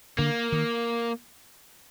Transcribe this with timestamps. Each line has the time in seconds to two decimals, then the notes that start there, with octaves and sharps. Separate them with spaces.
0.18 D3 A#3
0.52 D#3